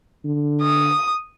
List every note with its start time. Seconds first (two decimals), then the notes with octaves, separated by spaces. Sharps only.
0.24 D3
0.62 D#6